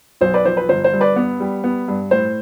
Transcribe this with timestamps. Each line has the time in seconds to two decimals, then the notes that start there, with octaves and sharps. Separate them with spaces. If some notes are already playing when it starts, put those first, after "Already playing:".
0.21 B1 C5
0.34 B4 D5
0.45 F3 C5
0.57 B4
0.69 G1 C5
0.84 C5
0.93 G2
1.01 B4 D5
1.16 B3
1.40 G3
1.64 B3
1.88 G2
2.11 A2 C5